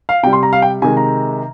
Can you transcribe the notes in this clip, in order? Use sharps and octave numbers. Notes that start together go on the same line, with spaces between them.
F5
C3 G3 G5
C6
A#5
F5
G5
C3 D#3 G#3 G#5
A#5